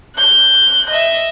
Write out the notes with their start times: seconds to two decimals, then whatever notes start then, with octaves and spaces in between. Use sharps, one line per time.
0.16 F#6 G6
0.90 D#5 E5